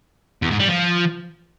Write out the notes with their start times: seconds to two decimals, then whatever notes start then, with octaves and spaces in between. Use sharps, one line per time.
0.42 E2
0.51 G#2
0.60 G3
0.68 F3